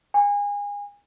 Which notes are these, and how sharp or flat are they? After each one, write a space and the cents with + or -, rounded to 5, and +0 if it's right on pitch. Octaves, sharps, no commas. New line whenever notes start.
G#5 -30